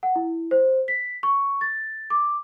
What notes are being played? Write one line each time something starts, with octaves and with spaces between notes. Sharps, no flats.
F#5
E4
C5
B6
C#6
A6
D6